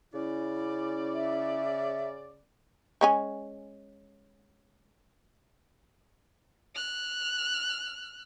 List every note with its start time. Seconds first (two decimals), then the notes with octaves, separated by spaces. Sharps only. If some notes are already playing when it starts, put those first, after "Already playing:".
0.13 C#3 C#4 E4 D5
1.14 E5
3.01 G#3 C#4 G#5
6.75 F6 F#6